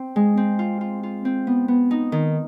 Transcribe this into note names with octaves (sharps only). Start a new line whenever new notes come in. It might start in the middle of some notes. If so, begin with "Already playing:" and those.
Already playing: C4
G#3
C4
F4
F4
F4
C4
B3
B3
D#4
D#3